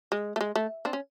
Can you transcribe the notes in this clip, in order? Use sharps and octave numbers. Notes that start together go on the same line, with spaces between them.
G#3
A3
G#3
A3
C4 D4
C#4